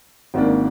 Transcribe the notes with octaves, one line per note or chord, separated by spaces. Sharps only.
G#1 G#2 D#3 A#3 D4